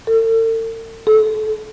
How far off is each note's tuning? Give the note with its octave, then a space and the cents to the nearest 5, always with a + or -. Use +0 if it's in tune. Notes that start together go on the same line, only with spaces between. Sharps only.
A4 +45
A4 -30